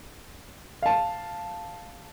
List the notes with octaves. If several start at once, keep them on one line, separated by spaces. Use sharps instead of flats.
F5 A5